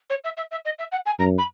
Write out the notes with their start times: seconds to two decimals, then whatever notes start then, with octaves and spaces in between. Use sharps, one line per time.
0.09 C#5
0.24 E5
0.37 E5
0.51 E5
0.65 D#5
0.78 E5
0.91 F#5
1.06 G#5
1.19 F#2 A#5
1.38 B5